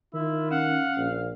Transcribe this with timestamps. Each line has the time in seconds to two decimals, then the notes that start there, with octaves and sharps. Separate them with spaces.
0.14 D#3 E4 F4
0.51 C#4 F5 F#5
0.98 A#1